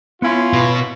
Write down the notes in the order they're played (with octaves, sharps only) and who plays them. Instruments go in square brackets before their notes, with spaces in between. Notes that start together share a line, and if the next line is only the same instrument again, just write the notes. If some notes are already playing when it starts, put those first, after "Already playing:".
[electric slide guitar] B3 C#5 [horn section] C#4 E4 F4
[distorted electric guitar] B2